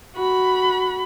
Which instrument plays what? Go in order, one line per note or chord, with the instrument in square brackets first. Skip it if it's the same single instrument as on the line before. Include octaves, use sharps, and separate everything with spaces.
[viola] F#4 B5